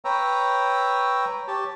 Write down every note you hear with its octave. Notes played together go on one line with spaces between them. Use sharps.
B4 C#5 G5 A#5 E6
G4 C#5 A5